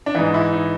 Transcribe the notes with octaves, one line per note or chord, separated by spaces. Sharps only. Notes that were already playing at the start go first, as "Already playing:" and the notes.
D4
G#2 E3 D#4
E4
D#4